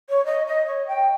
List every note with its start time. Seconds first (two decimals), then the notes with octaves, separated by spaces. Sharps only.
0.09 C#5
0.25 D#5
0.47 D#5
0.67 C#5
0.87 G5